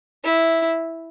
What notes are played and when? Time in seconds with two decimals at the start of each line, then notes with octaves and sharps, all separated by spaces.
0.24 E4